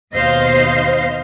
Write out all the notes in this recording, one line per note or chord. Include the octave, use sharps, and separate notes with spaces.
D#2 B2 C5 D#5 F5